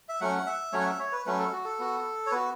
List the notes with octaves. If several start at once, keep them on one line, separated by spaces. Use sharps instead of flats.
E5
F#3 A3 C#4 F#5
E5
F#3 A3 C#4 C#5
F#5
E5
C#5
B4
F#3 A3 C#4 B4
A4
F#4
A4
B3 F#4
C#5
B3 F#4 B4